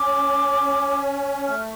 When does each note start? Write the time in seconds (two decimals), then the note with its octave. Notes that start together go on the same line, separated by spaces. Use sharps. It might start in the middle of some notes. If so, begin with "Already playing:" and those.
Already playing: C#4 D6
1.47 A3 F6